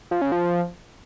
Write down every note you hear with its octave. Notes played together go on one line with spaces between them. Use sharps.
F3
C#3
F3